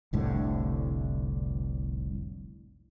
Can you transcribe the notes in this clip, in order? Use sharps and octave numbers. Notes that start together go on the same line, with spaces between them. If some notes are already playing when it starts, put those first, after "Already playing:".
F1 C2 A2 D3